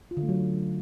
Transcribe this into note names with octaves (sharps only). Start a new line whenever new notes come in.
F4
D3
A3
F#3